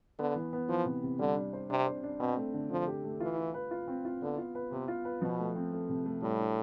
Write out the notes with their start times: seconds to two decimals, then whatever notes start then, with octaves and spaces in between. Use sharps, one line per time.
0.19 D3 B3
0.36 E3
0.53 B3
0.69 E3 F3
0.85 C3
1.03 C3
1.19 D3 G3
1.36 D4
1.53 C5
1.70 C3 D4
1.87 C5
2.03 D4
2.20 B2 C4
2.37 A3
2.54 D3
2.71 D3 F3
2.87 G4
3.05 A3
3.20 E3 F4
3.38 F4
3.54 B4
3.71 F4
3.88 C4
4.05 F4
4.22 D3 B3
4.38 F4
4.55 B4
4.71 C3 B3
4.88 F4
5.05 B4
5.22 B2 F3
5.39 A3
5.55 C4
5.73 A3
5.89 C3
6.06 A3
6.22 A2 G3
6.39 D4